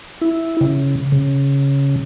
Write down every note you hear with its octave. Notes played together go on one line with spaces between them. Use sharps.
E4
C#3
C#3